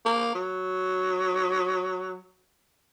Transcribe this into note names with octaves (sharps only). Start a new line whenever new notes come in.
A#3
F#3